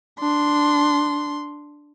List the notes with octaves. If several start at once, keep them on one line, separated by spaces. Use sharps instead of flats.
D4 C6